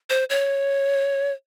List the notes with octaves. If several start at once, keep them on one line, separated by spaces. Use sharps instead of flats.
C5
C#5